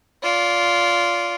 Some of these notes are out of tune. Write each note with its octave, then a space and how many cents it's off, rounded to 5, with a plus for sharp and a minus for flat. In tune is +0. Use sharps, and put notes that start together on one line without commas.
F4 +0 D5 -25